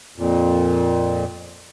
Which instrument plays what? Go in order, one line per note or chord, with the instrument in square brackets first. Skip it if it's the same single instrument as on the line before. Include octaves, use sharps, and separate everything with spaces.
[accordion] F2 A#2